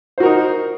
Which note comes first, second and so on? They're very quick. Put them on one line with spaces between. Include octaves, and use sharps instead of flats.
C5 F#4 A#4 D#4